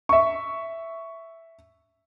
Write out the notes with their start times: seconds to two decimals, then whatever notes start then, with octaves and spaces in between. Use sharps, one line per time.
0.09 E5 C#6